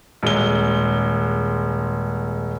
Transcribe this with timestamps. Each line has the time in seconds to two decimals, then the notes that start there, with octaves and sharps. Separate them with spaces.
0.23 D#1 G#3 G7